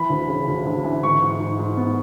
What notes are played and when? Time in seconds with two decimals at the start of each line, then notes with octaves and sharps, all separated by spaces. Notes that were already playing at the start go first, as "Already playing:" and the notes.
Already playing: E3 B5
0.10 D2
0.28 C#3
0.48 D2
0.66 D2
0.84 E3
1.03 G#2 C#6
1.22 G#2
1.40 G#2
1.59 G#2
1.77 B3